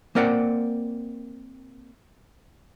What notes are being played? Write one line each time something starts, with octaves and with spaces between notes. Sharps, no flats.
A#3 C4 A#4 D5 F#5